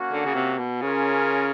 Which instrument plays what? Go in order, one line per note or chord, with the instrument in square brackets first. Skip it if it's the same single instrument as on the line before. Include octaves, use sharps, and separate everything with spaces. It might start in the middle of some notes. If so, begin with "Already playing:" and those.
Already playing: [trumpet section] A#3 C#4 F#4
[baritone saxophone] D3
C#3
C3
B2
[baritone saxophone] C#3 [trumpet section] C#4 F4 A#4